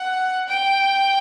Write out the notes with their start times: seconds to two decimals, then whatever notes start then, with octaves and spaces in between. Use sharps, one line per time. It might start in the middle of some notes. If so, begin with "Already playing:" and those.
Already playing: F#5
0.48 G5